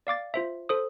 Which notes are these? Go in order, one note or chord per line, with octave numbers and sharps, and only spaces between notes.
D5 F5 D6 A6
F4 C5 E5
A4 C5 D#6